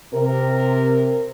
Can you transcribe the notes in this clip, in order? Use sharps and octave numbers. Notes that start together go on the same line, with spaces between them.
C3 A#4